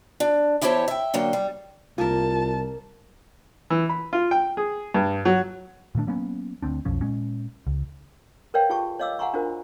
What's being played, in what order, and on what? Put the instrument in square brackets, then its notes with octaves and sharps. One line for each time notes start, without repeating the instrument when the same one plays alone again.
[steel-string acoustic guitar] D4
E2 E4 G4 C5 C#5 A5
E5 G5
D3 F#3 A#3 G5
G3
[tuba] C2 [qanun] A#3 A#4 [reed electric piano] F4 [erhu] A5
[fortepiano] E3
B5
F4
G5
G#4
G2
F#3
[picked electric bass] A#2 D#3 A3 D4
F#3 A#3 B3 C#4
D2 C4 D4
B1 F2 F3 C#4
A#2 G#3 C#4
C#2
[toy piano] A#4 B4 C#5 D5 F5 G5
F4 G4 G#4 G5 A5 C#6
C#5 D#5 F5 D6 E6
F5 F#5 G#5 A#5 C6 C#6
D4 F4 F#4 A#4 C5